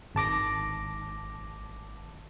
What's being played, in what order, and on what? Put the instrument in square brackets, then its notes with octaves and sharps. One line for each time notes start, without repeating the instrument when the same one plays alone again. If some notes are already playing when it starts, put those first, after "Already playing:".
[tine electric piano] G#1 A5 D6 A#6